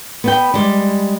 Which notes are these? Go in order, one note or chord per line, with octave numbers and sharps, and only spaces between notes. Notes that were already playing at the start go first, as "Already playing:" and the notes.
B3 B4 G5
G3 G#3